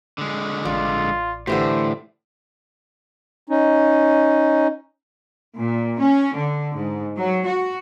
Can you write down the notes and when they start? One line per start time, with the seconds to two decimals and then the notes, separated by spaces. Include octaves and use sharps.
0.18 D3 G#3
0.65 A1 F4 D5
1.47 A2 D3 E3 G4 C5
3.49 C#4 D#4
5.59 A#2
5.99 C#4
6.36 D3
6.77 G#2
7.16 F#3
7.47 F#4